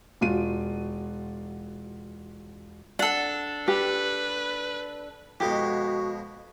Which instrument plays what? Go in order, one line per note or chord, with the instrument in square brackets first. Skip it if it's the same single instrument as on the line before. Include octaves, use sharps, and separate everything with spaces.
[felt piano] E1 F4 F#4 D#7
[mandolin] D4 A4 [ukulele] F#5
[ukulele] G4 [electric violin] B4
[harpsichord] F2 B2 G#3 [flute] F#4 [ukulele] G4